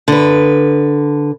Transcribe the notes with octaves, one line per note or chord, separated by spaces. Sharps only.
D3 B4